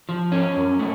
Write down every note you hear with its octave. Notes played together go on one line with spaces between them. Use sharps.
F3
C#4
F#2
A3